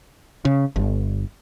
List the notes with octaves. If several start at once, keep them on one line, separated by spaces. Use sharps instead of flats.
C#3
G1